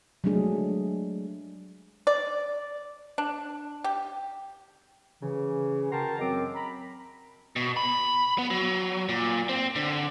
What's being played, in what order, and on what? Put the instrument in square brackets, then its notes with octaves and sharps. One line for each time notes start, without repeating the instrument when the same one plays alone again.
[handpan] F#3 G#3 A3 D4 G#4
[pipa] D5
D4
G4
[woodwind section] C#3 E3
F#4 A#4 G5 A5 A#5 C6
F#2 F#3 C4 A#4 D#5 D6
A#5 B5
[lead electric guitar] B2
B5
B3
F#3
A#2
C4
D3